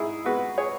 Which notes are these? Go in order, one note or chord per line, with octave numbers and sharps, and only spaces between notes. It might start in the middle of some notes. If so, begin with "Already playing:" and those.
Already playing: G#2 E4 G#4
G#3 B3 F#4 B4
G#4 C#5